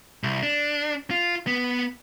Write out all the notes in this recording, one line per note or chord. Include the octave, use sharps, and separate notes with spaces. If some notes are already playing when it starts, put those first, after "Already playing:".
C2
D4
F4
B3